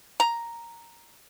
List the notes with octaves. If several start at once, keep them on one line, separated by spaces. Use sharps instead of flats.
A#5